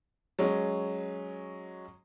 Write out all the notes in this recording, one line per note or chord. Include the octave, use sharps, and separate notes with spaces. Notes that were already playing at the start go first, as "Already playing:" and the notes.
F#3 G#3 C#4